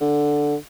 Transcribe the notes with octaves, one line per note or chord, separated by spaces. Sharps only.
D3